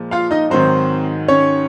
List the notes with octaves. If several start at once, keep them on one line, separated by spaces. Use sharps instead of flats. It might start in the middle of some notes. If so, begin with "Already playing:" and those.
Already playing: A#2 F3 G#3
F4 F5
D#4 D#5
G#2 D#3 F#3 C4 C5
C#4 C#5